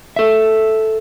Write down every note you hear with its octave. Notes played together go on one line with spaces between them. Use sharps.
A4 E5